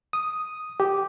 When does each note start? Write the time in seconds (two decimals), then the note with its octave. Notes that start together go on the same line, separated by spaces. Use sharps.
0.13 D#6
0.80 G4